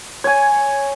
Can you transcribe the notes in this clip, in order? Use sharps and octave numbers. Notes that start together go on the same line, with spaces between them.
C#5 G#5